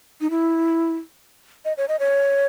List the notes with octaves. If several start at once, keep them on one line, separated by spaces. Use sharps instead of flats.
D#4
E4
D#5
C#5
D#5
C#5